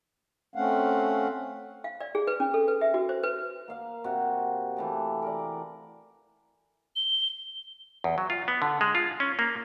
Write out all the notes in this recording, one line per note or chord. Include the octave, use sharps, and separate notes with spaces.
A3 C4 C#4 F5 F#5
F5
D5
G#4
B4
C#4
A4
B4
E5
F#4
C5
B4
A#3 F5
C3 F#4
E3 A3 G4
A#4 D5
G7
E2
F#3
F4
B3
D3
G#3
F4
C#4
A#3